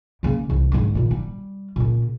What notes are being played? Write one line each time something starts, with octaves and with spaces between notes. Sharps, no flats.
C#3 A#3
C2 E3
G#2 D3
A#2 D#3
G3
A#2 C#3